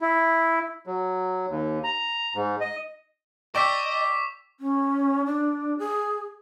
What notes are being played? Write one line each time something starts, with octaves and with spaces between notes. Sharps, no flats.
E4
F#3
D#2
A#5
G#2
D#5
D5 D#5 G5 C#6 D6 E6 B6
C#4
D4
G#4